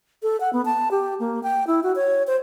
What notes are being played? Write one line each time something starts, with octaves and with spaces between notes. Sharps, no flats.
A4
F#5
B3
A5
G4
A#3
G5
E4
F#4
C#5
C5